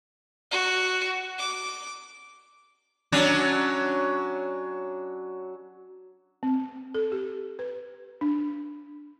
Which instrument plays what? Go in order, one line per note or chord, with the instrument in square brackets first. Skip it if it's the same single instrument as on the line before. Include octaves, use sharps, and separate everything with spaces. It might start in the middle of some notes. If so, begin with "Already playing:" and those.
[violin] F#4
D6
[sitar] F#3 C#4 D4
[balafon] C4
A4
G4
B4
D4